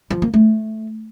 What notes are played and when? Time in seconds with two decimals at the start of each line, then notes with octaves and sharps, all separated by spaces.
0.10 F3
0.22 A#3
0.34 A3